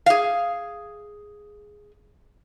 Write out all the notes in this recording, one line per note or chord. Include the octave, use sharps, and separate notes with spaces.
G#4 F5